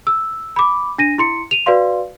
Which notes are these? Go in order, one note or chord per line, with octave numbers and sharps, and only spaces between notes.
E6
B5 D6
D4 A#6 D#7
E4 C6 C#7
D#7 F7
F#4 B4 D5 F5 C6